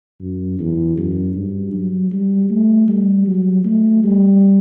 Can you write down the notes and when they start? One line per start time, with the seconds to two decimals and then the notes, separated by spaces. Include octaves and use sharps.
0.20 F#2
0.59 E2
0.97 F#2
1.35 G2
1.73 F#3
2.12 G3
2.50 A3
2.88 G3
3.27 F#3
3.65 A3
4.04 G3